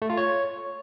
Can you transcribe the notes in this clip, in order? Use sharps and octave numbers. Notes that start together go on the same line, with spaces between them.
A3
F4
C#5